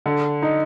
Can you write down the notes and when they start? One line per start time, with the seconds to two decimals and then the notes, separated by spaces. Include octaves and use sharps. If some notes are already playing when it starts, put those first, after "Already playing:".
0.06 D3
0.42 D#4